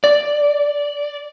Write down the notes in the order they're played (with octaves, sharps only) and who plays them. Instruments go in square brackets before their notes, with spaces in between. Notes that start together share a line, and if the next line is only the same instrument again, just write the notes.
[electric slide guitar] D5